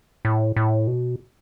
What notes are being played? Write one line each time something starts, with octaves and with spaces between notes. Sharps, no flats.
A2
A2
B2